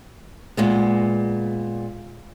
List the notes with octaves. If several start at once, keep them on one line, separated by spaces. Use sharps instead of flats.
A#2 G#3 B3